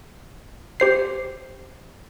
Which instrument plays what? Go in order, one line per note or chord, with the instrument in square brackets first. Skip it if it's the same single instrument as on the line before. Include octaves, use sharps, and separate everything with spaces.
[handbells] G4 C5 C7